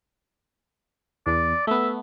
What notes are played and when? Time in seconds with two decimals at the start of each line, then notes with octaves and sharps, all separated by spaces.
1.27 E2 D5
1.67 A3 B3 E5